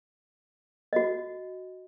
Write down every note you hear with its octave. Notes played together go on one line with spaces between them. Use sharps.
F#4 D#5